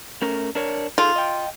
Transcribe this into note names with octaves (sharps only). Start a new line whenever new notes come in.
A3 C#4 A#4
D4 A#4 C#5
D#4 F4 G#4 A4
D#5 G5